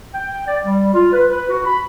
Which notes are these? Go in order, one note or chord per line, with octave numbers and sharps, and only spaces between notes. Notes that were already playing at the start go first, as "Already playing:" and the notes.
G5
D5
G3
F4
B4
B4
F#4
B5